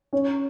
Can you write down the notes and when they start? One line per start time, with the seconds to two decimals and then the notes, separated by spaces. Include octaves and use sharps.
0.13 C#4